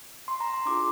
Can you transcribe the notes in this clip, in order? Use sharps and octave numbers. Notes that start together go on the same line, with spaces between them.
C6
A#5
C6
D4 F4 G#4 D6